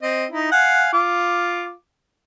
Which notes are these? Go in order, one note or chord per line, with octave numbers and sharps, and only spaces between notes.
C4 D#5
D#4 E4
F5 F#5 G#5
F4 D6